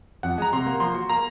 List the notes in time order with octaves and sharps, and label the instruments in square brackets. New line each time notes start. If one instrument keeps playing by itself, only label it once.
[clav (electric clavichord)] F2 [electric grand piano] F#5
[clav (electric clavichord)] G#3 [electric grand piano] A#5
[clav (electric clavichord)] C3 [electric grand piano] C6
[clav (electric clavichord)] A#3
[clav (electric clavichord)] F3 [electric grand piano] C6
[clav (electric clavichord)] F#4
[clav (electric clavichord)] A#3 [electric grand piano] A#5